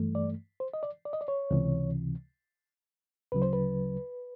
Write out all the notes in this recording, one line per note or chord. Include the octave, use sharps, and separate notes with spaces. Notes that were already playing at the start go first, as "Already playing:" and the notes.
Already playing: G2 E3 A3
D5
C5
D#5
D5
D5
D#5
D5
C#5
C#2 C3 E3
D2 C#3 F#3 B4
C5
B4